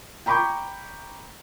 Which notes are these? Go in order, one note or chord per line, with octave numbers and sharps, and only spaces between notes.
G5 A#5 B5 C#6 D6 G6